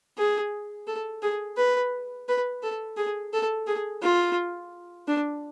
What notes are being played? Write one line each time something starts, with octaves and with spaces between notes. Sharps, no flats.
G#4
A4
G#4
B4
B4
A4
G#4
A4
G#4
F4
D4